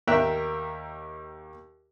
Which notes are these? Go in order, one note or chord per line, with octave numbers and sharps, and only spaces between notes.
D#2 A#4 E5 G5 E6 F#6